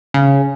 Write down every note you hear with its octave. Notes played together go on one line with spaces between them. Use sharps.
C#3